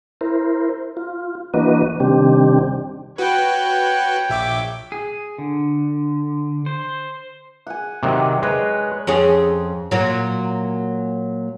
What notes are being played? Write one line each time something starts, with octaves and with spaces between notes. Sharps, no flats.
E4 A#4 C5
F4
E3 A#3 D4 F#4 B4 D#5
C3 D#3 G3 C4 D4 G4
F#4 B4 C#5 G5
A#1 E5 D6
G#4
D3
C5
F#5 G#5
C3 D#3 F#3 D5
G#3 A#4 B4 C#5
F2 C#4 G#4
A#2 F#3